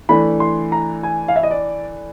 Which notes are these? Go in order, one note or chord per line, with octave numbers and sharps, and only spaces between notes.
E3 A3 D4 B5
C6
A#5
G#5
F5
E5
D#5
D5